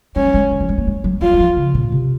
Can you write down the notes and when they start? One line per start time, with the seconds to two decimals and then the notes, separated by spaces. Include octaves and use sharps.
0.16 G#3 C#4
0.25 F#3
0.34 G#3
0.43 F3
0.51 D#3
0.60 F3
0.69 G#3
0.78 A#3
0.87 G#3
1.04 F#3
1.22 F#3 F4
1.33 F#3
1.40 F3
1.56 C#3
1.75 A#2
1.92 C3